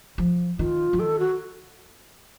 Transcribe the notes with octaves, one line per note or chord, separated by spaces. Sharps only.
F3
D#3 F4
F3
D#3 A4
F#4